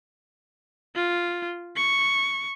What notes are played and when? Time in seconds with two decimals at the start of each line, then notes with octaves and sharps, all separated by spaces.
0.95 F4
1.76 C#6